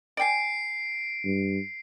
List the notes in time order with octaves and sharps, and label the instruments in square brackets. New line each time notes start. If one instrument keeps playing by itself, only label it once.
[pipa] D5 G5 G#5 [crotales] C7 D7
[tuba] G2